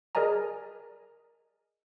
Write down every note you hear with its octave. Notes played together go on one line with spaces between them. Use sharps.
G#4 A#4 D5 D#5 G#5 A#5